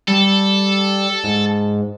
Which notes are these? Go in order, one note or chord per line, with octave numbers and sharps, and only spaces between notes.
G3 A4
G#2